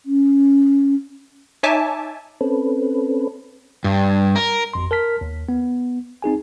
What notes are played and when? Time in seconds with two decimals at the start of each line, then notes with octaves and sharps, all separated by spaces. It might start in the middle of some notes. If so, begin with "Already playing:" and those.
0.06 C#4
1.63 D#4 C#5 E5 G#5 A5 D6
2.41 C4 C#4 A4 B4
3.84 G2
4.36 A#4
4.74 G#1 F2 C6
4.91 A#4 A5 F6 B6
5.21 D#2
5.49 B3
6.22 C4 D#4 G#4 G#5